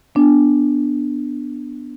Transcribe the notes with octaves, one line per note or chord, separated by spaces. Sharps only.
B3 D4